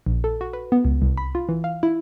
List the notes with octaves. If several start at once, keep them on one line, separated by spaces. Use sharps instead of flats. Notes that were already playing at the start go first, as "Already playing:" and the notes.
A#1
A4
F#4
B4
B3
C#2
C2
B5
F4
E3
F5
E4